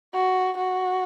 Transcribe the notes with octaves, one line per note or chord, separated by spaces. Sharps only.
F#4
F#4